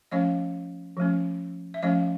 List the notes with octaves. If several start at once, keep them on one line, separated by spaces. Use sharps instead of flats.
F3 A3 C#4 D#5 F5
F3 A3 C#4
E5
F3 A3 C#4 D#5 F5